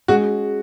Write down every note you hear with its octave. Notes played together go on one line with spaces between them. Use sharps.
G#3 C#4 F#4 G#4